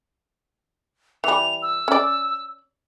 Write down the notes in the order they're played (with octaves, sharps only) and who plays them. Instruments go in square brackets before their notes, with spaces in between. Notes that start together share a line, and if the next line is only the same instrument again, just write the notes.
[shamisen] E3 G3 [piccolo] F7
[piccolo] E6
[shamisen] C#4 D5